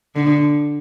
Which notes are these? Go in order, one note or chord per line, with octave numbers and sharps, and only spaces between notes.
D3